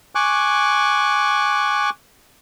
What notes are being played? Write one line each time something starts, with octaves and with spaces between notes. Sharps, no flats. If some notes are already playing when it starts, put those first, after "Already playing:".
G#5 C#6 D6 F#6